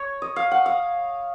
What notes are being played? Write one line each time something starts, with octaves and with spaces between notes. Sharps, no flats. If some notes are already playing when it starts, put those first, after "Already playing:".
Already playing: C#5
D#5
F5
F#5
F5